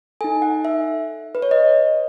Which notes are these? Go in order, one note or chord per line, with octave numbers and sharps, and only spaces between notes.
D#4 A4 G#5
F#5
E5
B4
C#5
D#5